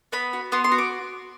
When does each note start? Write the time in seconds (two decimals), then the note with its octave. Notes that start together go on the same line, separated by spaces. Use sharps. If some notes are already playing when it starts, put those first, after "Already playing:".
0.12 B3 B5
0.33 F#4
0.52 B3 C6
0.64 C6
0.72 F#4
0.78 D6